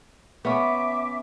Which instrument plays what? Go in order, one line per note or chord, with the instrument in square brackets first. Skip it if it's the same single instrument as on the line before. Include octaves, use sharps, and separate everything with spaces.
[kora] B3 C#4 [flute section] E5 D6